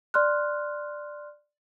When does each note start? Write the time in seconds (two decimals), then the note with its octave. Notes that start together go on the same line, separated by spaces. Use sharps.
0.14 D5 C6 F6 F#6